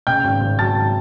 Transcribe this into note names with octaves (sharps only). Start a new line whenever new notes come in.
C#3 G5 G6
G#1
G#1
F#3 A5 A6
G#1